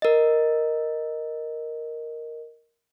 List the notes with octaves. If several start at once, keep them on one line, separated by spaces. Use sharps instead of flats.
A#4 D#5